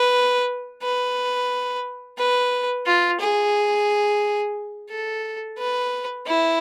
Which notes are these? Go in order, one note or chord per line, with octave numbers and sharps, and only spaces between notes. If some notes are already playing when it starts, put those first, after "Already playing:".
Already playing: B4
B4
B4
F4
G#4
A4
B4
E4